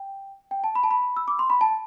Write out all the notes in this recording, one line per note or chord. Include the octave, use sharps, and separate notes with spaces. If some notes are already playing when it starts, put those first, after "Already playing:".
Already playing: G5
G5
A5
B5
A5
B5
E6
D6
C6
B5
A5